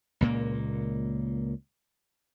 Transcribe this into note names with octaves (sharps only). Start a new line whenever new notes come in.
C#2 A#2 A#3